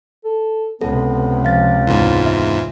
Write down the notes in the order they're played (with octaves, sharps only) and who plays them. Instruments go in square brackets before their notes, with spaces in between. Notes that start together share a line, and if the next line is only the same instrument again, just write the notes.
[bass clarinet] A4
[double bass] C#2 C3 [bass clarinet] B3 [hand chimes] A4
[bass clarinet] F3 [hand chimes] F5 A6
[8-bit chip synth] E2 G#2 [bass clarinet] F4
[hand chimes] E5